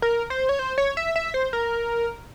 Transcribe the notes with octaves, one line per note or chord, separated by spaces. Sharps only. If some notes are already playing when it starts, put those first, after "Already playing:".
A#4
C5
C#5
C5
C#5
E5
E5
C5
A#4